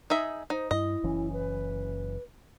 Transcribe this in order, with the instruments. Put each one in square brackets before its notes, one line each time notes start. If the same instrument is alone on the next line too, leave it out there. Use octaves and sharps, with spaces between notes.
[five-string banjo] D#4 G#4 E5
[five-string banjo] D#4 [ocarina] C5
[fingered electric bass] G2 [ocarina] E4 [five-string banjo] D#5
[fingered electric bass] F#1 E3 C#4
[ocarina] B4